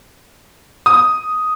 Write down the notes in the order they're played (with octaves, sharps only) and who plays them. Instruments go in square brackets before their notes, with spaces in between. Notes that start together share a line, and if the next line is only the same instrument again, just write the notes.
[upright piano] D#6